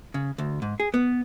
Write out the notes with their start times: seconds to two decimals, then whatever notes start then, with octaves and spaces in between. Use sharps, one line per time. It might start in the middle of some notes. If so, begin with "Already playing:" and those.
0.14 C#3
0.38 D2
0.62 G#2
0.80 G#4
0.94 B3